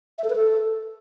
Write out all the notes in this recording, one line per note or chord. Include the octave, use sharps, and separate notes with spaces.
E5
A4
B4
A4